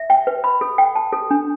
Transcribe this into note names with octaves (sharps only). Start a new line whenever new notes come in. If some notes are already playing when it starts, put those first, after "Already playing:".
Already playing: E5
G5
B4
B5
A4
G5
A5
A4
D4